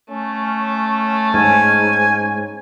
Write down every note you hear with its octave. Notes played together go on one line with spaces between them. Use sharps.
A3 C#4
G#2 G#5